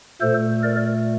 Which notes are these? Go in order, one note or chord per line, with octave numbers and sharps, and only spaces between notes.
A#2 A3 A4 C5
A#4 D5